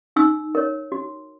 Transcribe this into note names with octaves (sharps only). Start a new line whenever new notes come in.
D#4 E6
A#4 C#5
F#4